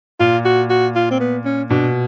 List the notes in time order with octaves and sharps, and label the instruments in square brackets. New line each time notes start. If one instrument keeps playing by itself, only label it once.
[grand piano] A#2 [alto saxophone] F4
[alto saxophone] F#4
F#4
F4
C4
B3
C#4
[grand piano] B2 [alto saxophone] D4